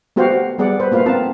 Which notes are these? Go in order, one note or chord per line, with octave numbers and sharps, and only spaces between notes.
A3 B3 F#4 G4 C5 F5
G3 B3 G#4 D5 F#5
B4 C5
A3 A#3 F4 B4 F5
B3 C4 F4 A#4 A5